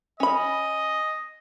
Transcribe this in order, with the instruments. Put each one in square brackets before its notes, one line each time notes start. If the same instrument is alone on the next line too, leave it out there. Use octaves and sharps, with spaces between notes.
[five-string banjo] C#4 B5 [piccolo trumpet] D#5